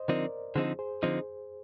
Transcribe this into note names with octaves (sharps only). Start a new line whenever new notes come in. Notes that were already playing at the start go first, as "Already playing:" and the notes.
Already playing: C5 D#5
D3 F3 C4 D#4 A#4 D5
D3 F3 C4 D#4 G#4 C5
G#4 C5
D3 F3 C4 D#4